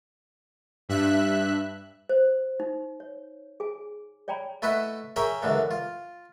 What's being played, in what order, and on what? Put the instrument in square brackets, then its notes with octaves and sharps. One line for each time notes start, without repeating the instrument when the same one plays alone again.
[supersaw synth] G2 E5 F#6
[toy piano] C5
D#4
C#5
G#4 G#5
C#5 D5 G5 G#5 A#5 B5
[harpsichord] A3 E4 B4 D#5 E5 F#5
G#4 A#4 C#5 E5 G5 G#5
C#2 F#2 D3 E3
F4